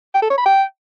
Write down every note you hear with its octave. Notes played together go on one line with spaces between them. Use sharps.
G5
A4
C#5
B5
G5